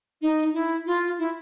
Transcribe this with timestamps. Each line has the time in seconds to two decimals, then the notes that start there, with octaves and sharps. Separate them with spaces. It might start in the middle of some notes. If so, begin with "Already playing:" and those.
0.21 D#4
0.53 E4
0.86 F4
1.18 E4